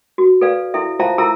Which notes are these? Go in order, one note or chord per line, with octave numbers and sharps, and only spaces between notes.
F#4
A4 B4 D5 F5
E4 A4 E5
F4 C5 E5 F5 A5 A#5
E4 F4 A4 E5 A#5 E6